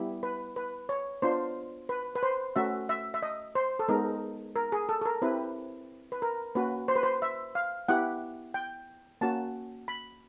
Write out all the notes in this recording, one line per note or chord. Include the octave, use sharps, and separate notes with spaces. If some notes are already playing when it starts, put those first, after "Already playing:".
Already playing: G3 B3 E4 G4
B4
B4
C#5
B3 D4 F4 C5
B4
B4
C5
A3 C#4 F#4 E5
E5
E5
D#5
C5
A4
G#3 B3 D#4 A#4
A#4
G#4
A4
A4
A#4
C4 E4 G4 B4
B4
A#4
A#3 C#4 F#4 B4
C5
B4
C5
E5
F5
B3 E4 G4 F#5
G5
A#3 C#4 F#4 A5
B5